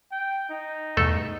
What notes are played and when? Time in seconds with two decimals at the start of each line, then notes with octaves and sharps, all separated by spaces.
0.11 G5
0.49 D#4
0.97 E2 G2 B2 A3 A4